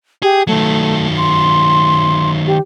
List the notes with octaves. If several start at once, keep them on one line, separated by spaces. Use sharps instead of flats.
G4 G#4
D#3 F#3 A3
C6
G4